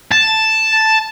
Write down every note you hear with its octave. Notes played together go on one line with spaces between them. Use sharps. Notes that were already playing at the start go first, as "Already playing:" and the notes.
A5